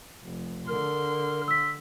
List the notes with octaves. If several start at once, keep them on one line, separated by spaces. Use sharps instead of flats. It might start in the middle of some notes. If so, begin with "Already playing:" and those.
F1
D3 A#4 C6
E6 B6